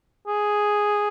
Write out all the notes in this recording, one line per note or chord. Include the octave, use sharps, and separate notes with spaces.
G#4